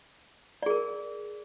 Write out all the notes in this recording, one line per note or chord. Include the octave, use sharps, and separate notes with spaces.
G#4 A#4 D5